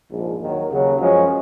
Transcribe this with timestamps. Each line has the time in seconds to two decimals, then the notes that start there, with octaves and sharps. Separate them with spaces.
0.11 A#1 G#2 F3
0.40 D#2 D#3 F#3
0.70 D#2 C#3 F#3 C#4
0.99 F#2 F3 G#3 C#4